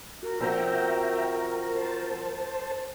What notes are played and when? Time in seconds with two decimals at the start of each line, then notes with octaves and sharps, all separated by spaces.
0.23 F#4 A#4
0.40 F3 C4 F#4 E5 G5 A#5
1.76 C5 A5